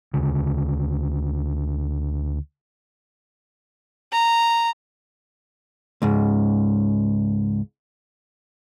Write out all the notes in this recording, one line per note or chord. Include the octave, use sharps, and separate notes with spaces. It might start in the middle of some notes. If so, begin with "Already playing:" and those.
D2 C#3
A#5
C#2 G#2